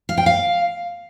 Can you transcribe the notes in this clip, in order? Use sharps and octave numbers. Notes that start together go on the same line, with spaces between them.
F5
G5
F5